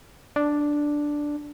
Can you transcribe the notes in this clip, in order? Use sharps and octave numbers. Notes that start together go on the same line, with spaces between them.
D4